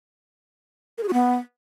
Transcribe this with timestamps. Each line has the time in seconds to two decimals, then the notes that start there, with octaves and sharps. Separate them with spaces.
0.98 A#4
1.03 G#4
1.08 F#4
1.14 B3